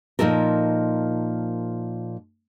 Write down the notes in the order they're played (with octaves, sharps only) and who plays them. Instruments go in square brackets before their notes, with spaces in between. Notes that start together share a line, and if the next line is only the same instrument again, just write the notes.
[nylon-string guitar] A#2 F3 D#4 A4 A#4